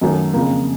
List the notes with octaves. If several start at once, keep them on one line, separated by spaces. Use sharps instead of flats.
F#2 D#3 F#3 A3
F2 C#3 F3 A#3